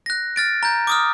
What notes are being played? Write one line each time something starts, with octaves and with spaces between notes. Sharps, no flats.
F#6 A#6
F6 A6 D7
A#5 G6
D6 D#6 F6